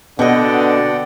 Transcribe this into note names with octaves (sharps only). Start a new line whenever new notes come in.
B2 D3 B3 D5 D#5 F#5 G5